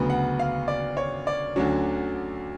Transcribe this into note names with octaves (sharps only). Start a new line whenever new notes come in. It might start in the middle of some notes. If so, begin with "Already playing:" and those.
Already playing: D2 C#3 F#3 B3
F#5
F5
D5
C#5
D5
D2 D3 F#3 C#4